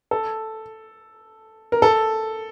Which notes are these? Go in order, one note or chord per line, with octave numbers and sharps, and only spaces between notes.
A4
A#4
A4